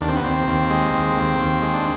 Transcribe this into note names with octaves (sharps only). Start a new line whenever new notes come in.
D#2 D4
C4
B3
D#2 C4
D#2
G#3
D#2
D#2
D#2
G#3
D4